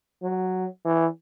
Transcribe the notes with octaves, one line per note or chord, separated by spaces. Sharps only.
F#3
E3